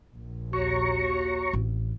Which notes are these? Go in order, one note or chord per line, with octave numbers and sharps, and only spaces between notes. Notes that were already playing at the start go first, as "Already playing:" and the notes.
A#1
D#2 F#4 C#5 A#5 C#6
A1 C4